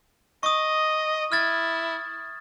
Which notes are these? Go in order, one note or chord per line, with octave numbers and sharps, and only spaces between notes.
D#5 C#6 D#6
E4 F6 G#6 A6